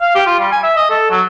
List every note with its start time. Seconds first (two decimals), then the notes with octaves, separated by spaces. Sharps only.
0.01 F5
0.15 G4
0.26 F4
0.39 G3
0.52 G#5
0.64 E5
0.76 D#5
0.90 A4
1.10 F#3